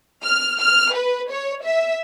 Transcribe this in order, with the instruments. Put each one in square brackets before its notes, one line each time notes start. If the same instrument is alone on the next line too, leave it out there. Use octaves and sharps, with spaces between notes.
[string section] F6
F6
B4
C#5
E5